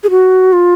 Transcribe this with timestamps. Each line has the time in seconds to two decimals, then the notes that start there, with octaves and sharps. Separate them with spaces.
0.04 G#4
0.10 F#4
0.53 F4